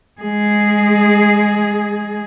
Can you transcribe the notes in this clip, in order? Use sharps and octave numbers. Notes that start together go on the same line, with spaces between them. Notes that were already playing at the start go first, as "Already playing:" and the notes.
G#3 G#4